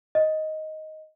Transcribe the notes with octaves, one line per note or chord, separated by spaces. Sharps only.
D#5